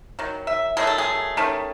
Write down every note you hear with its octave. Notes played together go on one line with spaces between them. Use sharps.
D#3 F#3
E5
D#3 F#3 A3 G#4
A4
G#4
D#3 A3 C#4